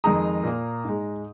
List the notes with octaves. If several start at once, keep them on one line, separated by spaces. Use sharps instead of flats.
F2 D#3 G#3 A#5 D#6
A#2 A#3
G#2 G#3